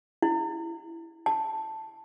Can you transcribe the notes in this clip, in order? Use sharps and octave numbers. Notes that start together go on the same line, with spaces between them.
E4
A5